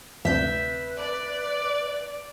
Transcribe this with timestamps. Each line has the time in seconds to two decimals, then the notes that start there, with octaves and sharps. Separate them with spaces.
0.25 D2 C3 B4 E5 G6
0.98 D5